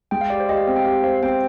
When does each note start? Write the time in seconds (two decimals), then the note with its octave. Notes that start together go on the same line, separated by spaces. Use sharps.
0.11 G#3 G5
0.21 F5
0.30 G4 D5
0.40 C5
0.49 G4 D#5
0.57 F5
0.67 C4 F5
0.76 G5
0.85 G4 F5
1.04 C5 F5
1.23 C4 G5